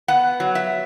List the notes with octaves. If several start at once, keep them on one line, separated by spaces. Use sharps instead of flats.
B3 F#5
F#3
E5